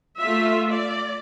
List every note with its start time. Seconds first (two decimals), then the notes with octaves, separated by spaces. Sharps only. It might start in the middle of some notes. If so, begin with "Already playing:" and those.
0.18 A3 F4 E5
0.71 D5